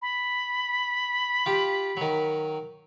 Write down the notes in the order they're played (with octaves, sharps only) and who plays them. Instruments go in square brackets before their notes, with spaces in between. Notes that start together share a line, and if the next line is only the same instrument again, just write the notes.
[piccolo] B5
[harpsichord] F4 G4
D#3 F#3